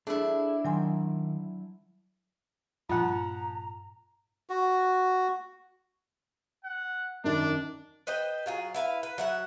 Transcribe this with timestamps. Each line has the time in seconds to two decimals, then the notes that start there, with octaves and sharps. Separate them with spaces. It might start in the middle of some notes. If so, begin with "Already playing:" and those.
0.07 D4 E4 G#4 A4 E5
0.65 D#3 F#3 G#5 C6
2.89 G2 A#2 F3 F4 F#5 A#5
4.49 F#4
6.64 F#5
7.24 F#2 D#3 D4
8.07 B4 C5 D#5 G5
8.46 F#3 F4 G#4
8.74 E4 B4 F5
9.03 B4
9.18 F#3 E5 F#5